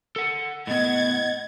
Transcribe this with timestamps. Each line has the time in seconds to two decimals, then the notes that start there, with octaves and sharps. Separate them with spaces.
0.16 A4 F#5
0.67 A2 B3 D#5 F#5 G#6 A6